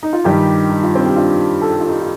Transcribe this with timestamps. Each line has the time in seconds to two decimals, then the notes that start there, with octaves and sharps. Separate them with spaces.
0.03 D#4
0.13 F4
0.24 G2 D#3 G3 D#4 G4
0.70 D#4
0.83 F4
0.95 C4 D#4
1.06 G4
1.16 D4 F4
1.62 A4
1.71 G4
1.80 F4
1.88 D#4 G4
2.00 F4